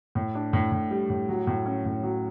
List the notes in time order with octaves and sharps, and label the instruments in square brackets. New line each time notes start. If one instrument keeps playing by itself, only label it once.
[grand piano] A2
D4
A2
A2
G3
A2
F#3
A2
C#4
A2
F#3